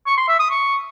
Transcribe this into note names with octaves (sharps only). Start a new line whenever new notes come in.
C#6
C6
E5
D#6
C#6